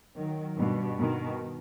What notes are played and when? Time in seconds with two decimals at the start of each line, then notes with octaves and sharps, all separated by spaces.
0.16 D#3 F#3
0.57 G2 B2
0.99 B2 D#3